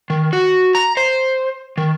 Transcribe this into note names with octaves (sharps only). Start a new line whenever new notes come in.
D#3
F#4
A#5
C5
D#3